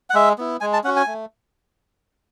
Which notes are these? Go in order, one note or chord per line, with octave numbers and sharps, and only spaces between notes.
F#5
G#3 E5
B3 E4
G#3 G#5
A5
C#4 F#4 F#5
G#5
A3